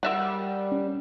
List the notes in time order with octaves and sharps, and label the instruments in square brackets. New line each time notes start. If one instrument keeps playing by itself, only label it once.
[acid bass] G3 [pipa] A#4 E5 F#5
[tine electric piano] C#4